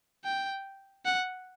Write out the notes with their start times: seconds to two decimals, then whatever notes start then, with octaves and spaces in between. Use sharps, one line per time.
0.24 G5
1.05 F#5